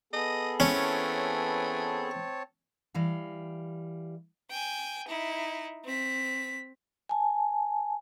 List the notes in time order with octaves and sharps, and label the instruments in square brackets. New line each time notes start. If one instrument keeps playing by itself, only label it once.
[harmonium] B3 G#4 A4 [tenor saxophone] D#5
[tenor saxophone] E3 [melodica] C4 C#5 A5 [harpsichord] C#4
[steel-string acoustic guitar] E3 G3 F5
[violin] G5 G#5
D#4 E4
C4 B6
[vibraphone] G#5 A5